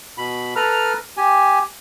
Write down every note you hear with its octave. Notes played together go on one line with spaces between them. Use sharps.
B2 B5
A4 B4 A#5 F6
G4 G#5